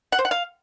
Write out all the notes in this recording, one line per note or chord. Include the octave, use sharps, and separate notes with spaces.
F#5
C5
F#5
F5